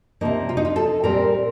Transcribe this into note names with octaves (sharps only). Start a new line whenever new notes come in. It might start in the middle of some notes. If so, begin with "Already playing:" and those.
C3 F3 A#3 D#4
F4
D#4
F4
A4
A#2 G3 C4 A#4